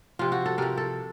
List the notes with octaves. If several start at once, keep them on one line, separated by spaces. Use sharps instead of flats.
C3 F3 F4
F#4
A4
C3 F3 A#4
A4